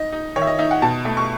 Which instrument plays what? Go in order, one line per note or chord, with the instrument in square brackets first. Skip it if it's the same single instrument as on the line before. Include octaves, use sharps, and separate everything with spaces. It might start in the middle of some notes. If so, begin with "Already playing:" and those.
Already playing: [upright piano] D#4 D#5
D#4
D#3 C#5
E5
D#5
D#4 E5
F#5
B2 A5
A3
C#6